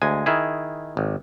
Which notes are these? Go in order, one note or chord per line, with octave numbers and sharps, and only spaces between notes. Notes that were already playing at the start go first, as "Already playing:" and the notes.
D2 G#3 G#5
D#3 E4 G#4
G#1